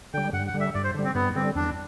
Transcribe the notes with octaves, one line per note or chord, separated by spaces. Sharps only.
D3 G3 G5
G2 F#5
F#5
D3 G3
E5
G2 D5
C5
D3 G3
C4
G2 B3
D3 G3 C4
E2 D4